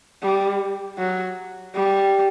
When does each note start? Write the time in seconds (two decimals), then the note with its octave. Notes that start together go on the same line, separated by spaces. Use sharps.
0.22 G3
0.98 F#3
1.75 G3